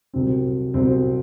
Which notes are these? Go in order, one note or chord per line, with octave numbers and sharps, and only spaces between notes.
C2 C3 F#3 C4
C2 C3 F#3 C4